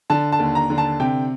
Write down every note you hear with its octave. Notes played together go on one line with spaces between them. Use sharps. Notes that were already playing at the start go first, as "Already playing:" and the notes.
D3 A5
A5
D#2
A#5
D3
A5
C3 G5